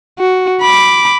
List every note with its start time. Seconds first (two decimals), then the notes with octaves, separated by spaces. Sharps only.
0.19 F#4
0.62 B5 D6